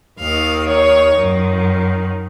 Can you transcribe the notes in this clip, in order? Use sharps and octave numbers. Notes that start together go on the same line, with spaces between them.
D#2 D#3 F5
C#5
F#2 D#3